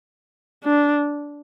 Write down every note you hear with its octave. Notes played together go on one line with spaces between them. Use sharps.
D4